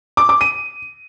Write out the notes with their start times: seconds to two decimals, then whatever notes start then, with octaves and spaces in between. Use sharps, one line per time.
0.17 D6
0.29 D6
0.41 D#7